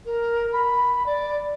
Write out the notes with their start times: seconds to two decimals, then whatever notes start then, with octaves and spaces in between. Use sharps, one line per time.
0.06 A#4
0.53 B5
1.06 D5